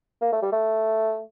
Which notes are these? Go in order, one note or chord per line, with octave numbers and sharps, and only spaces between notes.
A#3
A3
G3
A3